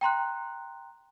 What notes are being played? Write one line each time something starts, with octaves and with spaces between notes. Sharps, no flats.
G5 A#5 C6 F#6